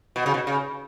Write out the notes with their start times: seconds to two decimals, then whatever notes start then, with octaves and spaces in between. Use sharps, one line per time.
0.16 B2
0.26 C#3
0.34 B2
0.47 C#3